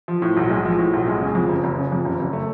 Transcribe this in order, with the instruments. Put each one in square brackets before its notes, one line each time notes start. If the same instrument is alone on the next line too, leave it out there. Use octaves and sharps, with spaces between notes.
[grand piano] F3
A2
B1
G#3
F3
A2
B1
G#3
C#3
F2
F#1
F#1
C#3
F2
F#1
F#1
A3